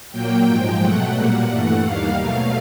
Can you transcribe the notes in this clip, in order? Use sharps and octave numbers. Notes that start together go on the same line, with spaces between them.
A#2 F#3 A#3 G5
G#2 F3 G#3
B2 F#3 A3 F#5
A#2 G3 A#3 F#5
G2 E3 A3
D#2 D#3 G3 A#3 F5
B2 F#3 A3